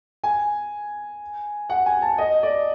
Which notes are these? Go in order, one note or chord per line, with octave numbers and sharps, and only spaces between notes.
G#5
F#5
G#5
A5
D#5
D5